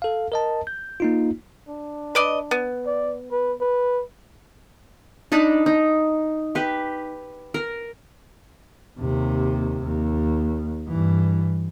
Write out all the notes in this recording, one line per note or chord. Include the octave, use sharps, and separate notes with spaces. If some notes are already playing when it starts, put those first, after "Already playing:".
A4 F5
A#4 D#5 A5
G6
A#3 D#4 F4
D4
B4 D5 D#5
B3
D5
B4
B4
D4 D#4 A5 B5
D#4
G4 B4
A#4
D#2 C3
D#2
G2 E3